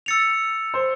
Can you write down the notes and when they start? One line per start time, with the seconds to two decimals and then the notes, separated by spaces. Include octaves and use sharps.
0.06 E6 A6 C#7 F7
0.74 C5